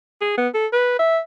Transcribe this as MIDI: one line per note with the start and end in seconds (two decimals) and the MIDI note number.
0.21 0.34 68
0.37 0.48 59
0.54 0.66 69
0.73 0.96 71
0.99 1.19 76